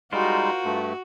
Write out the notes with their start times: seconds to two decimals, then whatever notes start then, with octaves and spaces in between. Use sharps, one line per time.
0.12 G3 G#3 D#4 F4 F#4 A#4 C5
0.65 G2 A3